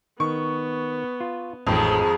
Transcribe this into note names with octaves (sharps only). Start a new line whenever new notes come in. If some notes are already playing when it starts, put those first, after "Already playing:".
D#3 B3 C#6
F4
A1 F2 G#2 D#3 G#3 G5